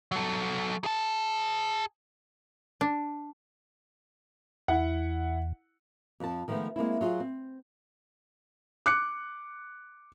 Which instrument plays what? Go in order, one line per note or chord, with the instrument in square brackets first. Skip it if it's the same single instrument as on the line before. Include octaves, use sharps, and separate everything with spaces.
[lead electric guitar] F#3 A4
G#4 A5
[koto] D4
[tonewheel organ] E2 [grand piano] E4 F#5
[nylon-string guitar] F2 A5
D#3 F3 G#3 A3 B3
G#3 A#3 C4 E4
F#3 F4 F#4 G#4
C4
[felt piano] D6 F#6 C#7